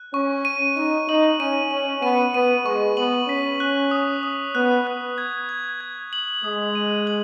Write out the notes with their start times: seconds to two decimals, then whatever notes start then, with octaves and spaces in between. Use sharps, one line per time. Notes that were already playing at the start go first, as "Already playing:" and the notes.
Already playing: F#6
0.14 C#4 C#6
0.45 D#7
0.77 D#4 D#7
1.08 D#4 F#7
1.39 C#4 D#7
1.71 C#4 D#7
2.02 B3 D#7
2.34 B3 D#7
2.65 G#3 C#6
2.97 B3 F#7
3.28 C#4 B6
3.60 F#6
3.91 D#6
4.23 D#6
4.55 B3 F#6
4.87 F#6
5.18 G#6
5.49 G#6
5.81 G#6
6.13 F#7
6.44 G#3 D#6
6.75 D#7
7.07 F#7